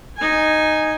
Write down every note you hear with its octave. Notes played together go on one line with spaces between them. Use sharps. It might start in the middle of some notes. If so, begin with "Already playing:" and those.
D#4 G#5